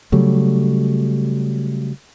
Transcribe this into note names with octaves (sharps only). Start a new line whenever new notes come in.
C#3 F#3 G3 A3